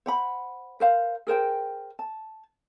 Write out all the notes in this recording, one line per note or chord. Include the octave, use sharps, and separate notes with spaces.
C5 F#5 B5
A#4 C5 F5
G#4 A#4 C5 G5
A5